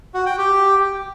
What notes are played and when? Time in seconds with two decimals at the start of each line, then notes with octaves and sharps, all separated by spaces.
0.14 F#4
0.26 G5
0.38 G4